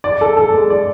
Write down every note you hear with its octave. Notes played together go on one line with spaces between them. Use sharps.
D5
A4
A4
G#3
D5